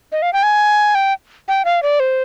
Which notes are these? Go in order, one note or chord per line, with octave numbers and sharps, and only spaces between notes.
D#5
F5
G5
G#5
G5
G5
F5
D5
C5